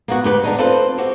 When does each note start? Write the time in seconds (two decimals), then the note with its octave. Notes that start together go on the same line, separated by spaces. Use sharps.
0.08 A#3 B3 F#4
0.24 D2 G4 B4
0.43 D3 D4 D#4
0.58 C4 F4 A4 B4 C5
0.98 C4 F#4 G4